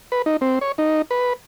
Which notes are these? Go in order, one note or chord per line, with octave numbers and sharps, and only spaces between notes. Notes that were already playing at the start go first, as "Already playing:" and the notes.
B4
D#4
C4
C#5
D#4
B4